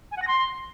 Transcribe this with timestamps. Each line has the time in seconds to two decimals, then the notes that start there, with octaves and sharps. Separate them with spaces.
0.11 G#5
0.17 F#5
0.22 A#6
0.27 C6